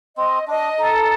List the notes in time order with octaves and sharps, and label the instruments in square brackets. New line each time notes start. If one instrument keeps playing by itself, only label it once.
[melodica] C4 [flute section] D#5
[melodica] D4 [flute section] D#5
[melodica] D#4 [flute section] A4